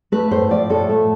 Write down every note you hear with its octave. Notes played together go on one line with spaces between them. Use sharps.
A3 B4
A2 C5
F3 D5
A2 A4
A3